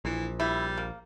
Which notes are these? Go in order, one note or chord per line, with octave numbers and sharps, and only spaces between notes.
A#1 E3
G3 E4
A#3